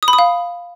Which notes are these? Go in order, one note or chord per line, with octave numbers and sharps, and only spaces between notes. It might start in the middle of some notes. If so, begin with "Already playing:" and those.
D#6
B5
D#6
F5